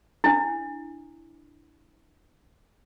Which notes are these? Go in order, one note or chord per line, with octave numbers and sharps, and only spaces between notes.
D4 E4